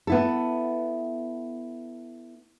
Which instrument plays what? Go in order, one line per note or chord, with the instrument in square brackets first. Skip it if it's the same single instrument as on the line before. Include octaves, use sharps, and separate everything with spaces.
[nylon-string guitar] B3 E4 A4